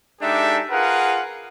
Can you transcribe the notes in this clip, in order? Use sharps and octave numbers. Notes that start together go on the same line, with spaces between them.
G#3 D4 D#4 G4 A4 E5
F4 G#4 A#4 B4 F#5